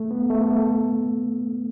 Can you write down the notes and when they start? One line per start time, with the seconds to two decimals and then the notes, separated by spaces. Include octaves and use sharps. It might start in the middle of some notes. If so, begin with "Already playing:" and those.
Already playing: A3
0.11 B3
0.30 A3
0.41 B3
0.50 A3